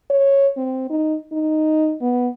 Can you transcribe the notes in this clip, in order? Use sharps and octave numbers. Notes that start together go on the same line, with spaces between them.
C#5
C4
D#4
D#4
B3